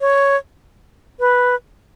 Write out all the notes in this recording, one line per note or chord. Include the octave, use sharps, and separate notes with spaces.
C#5
B4